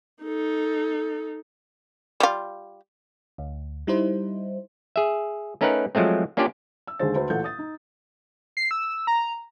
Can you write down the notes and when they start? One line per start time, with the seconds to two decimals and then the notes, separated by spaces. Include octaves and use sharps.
0.23 D#4 A4
2.20 G3 F4
3.38 D2
3.87 G3 D#4 E4 C5
4.96 G#4 E5
5.61 A3 C#4 D#4 A#4 B4 F#5
5.95 F3 F#3 G#3 A3 C4
6.37 A#3 C#4 D4 F4 G4 D5
6.87 E6
6.99 D#2 D3 G#3 G#4 C5 A6
7.15 D2 B4 C5
7.30 A1 A#2 A4 F#5 G6
7.44 D#6 A6
7.59 D#4
8.57 C7
8.71 E6
9.07 A#5